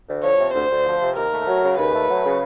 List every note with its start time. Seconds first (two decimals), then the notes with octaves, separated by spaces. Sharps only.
0.08 D2
0.23 F3 C#5
0.39 C3
0.54 D2 C5
0.70 D2
0.85 F3
1.00 C3
1.16 D#2 A#4
1.32 A3
1.47 F#3
1.63 C#3
1.78 D#2 B4
1.93 A3
2.09 F#3
2.24 C#3